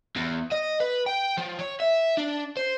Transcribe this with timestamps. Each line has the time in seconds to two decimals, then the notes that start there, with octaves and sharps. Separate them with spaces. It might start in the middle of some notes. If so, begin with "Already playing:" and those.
0.16 E2
0.52 D#5
0.80 B4
1.06 G5
1.38 F3
1.59 C#5
1.80 E5
2.17 D4
2.57 C5